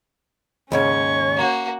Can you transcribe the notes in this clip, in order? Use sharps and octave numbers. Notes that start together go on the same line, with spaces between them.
D#2 G#2 C#3 C#4 C#5 C#6
A#3 F#4